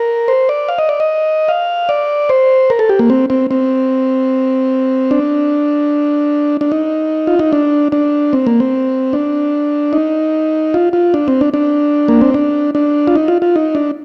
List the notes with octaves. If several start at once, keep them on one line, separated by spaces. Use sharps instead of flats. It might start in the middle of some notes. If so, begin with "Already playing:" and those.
Already playing: A#4
C5
D5
F5
D#5
D5
D#5
F5
D5
C5
A#4
A4
G4
A#3
C4
C4
C4
D4
D4
D#4
F4
D#4
D4
D4
C4
A#3
C4
D4
D#4
F4
F4
D4
C4
D4
D4
A#3
C4
D4
D4
F4
D#4
F4
F4
D#4
D4